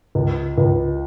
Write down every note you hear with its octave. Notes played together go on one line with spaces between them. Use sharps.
C#2
C#2